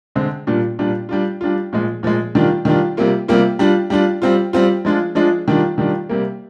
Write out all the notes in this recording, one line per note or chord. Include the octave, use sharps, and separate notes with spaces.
D3 G#3 C4
A#2 G3 D4 F4
A#2 G3 D4 F4
G3 D4 F4
G3 D4 F4
A#2 F3 G#3
A#2 F3 G#3
D#3 G3 D4 F4
D#3 G3 D4 F4
C3 G3 A#3 F4
C3 G3 A#3 F4
G3 D4 F4
G3 D4 F4
G3 C4 F4
G3 C4 F4
F3 G#3 D4 F4
F3 G#3 D4 F4
D#3 G3 D4 F4
D#3 G3 D4 F4
C3 G3 A#3